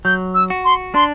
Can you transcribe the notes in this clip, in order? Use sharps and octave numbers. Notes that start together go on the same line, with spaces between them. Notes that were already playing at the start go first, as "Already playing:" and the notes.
F#3 G6
E6
F#4
C6
D4 C6